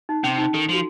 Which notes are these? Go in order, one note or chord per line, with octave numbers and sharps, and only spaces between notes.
D#4
C3 C#4
D#4
D#3 A4
F3 F#4